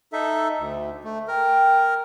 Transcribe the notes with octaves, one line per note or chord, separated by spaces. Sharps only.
D#4 A4 E5
D2
A3
A#4 G5